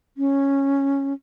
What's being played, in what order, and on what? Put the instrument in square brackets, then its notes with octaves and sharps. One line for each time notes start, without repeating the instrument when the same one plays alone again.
[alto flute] C#4